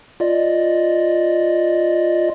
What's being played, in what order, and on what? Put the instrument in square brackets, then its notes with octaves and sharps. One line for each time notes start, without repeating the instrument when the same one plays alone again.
[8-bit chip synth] F4 D5 D#5